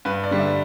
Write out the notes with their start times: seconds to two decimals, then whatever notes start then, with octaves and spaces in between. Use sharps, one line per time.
0.05 G2 B4
0.24 D5
0.31 D3 G3
0.40 E5